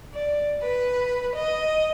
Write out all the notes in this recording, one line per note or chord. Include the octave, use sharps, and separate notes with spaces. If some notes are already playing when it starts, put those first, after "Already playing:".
D5
B4
D#5